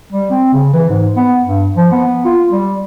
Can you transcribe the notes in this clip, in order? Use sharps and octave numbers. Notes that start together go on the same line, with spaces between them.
G3
C4
C#3
E3
G#2
B3
G2
F3
B3
F4
G3